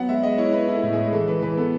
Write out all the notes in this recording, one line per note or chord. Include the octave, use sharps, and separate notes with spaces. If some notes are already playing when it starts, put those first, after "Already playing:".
Already playing: F#3 B3 F#5
G#3 E5
G#3 D#5
E4 C#5
B3 B4
E4
A4
A2
G#3 G#4
E3 A4
E3 B4
E3 B4
B3 A4